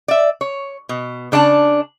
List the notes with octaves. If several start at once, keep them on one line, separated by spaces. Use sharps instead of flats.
D5 E5
C#5
B2
C#3 D4 D5 A5